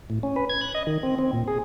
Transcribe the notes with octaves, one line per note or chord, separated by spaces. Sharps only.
A2
C#4
B4
G#6
F#6
D#5
D#3
C4
C4
A#2
G#4